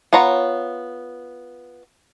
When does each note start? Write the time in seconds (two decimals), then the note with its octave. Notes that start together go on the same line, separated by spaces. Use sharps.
0.13 B3 F4 C#5 A#5